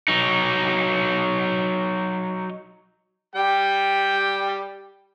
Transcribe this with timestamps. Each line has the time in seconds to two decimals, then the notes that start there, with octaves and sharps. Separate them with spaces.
0.08 F#3 D#4
3.35 G3 G4 G5